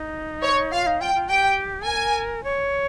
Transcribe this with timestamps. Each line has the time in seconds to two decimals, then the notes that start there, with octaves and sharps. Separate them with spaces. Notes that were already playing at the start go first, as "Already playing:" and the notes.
Already playing: D#4
0.43 C#5
0.72 F4 F5
0.86 D#4
1.01 F4 G5
1.15 F4
1.29 G4 G5
1.86 A#4 G#5
2.44 C#5